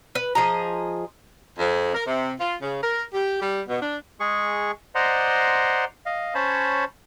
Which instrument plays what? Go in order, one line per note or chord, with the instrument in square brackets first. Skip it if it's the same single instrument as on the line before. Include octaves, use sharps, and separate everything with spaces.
[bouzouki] B4
F3 G#4 D#5 A#5
[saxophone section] F2
A#4
C3
F4
C#3
A#4
G4
G3
B2
D4
[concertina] G#3 G#4 C#6
C5 D5 D#5 F#5 A#5 C6
D#5 F5
C#4 C5 C#5 A5 B5